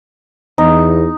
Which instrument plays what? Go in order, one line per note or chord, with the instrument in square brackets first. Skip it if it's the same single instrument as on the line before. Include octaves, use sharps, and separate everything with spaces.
[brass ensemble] E2 [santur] D#4